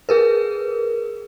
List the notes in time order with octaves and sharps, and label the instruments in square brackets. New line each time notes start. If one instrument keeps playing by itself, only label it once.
[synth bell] G#4 A#4 B4